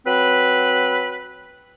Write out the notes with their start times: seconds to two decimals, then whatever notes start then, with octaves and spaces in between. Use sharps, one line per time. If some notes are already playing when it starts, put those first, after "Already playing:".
0.06 F#3 C4 B4